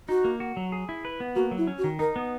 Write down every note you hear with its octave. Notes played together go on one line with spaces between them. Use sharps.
D#4 F#4
A#3
F#4
F#3
G#4
E4
B4
B3
A#3 F#4
F#3
E4
C#4
F#4
D#3
D#4 A#4
B3